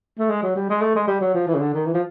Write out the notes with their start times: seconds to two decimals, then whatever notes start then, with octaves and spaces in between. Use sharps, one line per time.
0.19 A3
0.30 G#3
0.43 F#3
0.56 G3
0.69 G#3
0.82 A3
0.95 G#3
1.07 G3
1.21 F#3
1.34 F3
1.47 E3
1.55 C#3
1.60 D3
1.74 D#3
1.86 E3
1.94 F3